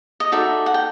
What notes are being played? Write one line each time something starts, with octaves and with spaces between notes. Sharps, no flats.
D#5
D#4 F#4 A4 D5 E5
F#5
G5